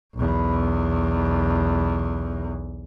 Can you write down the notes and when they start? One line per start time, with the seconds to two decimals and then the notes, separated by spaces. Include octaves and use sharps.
0.15 B1 E2